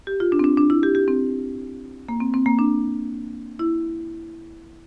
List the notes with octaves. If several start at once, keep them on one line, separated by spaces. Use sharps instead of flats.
G4
F4
D4
C4
D4
D4
E4
G4
G4
C4
A#3
C4
C4
A#3
D4
E4